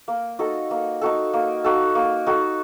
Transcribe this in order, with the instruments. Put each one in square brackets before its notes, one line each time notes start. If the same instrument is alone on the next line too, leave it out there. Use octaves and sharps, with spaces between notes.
[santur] A#3
D#4 F#4 A4
A#3
D#4 F#4 A4
A#3
D#4 F#4 A4
A#3
D#4 F#4 A4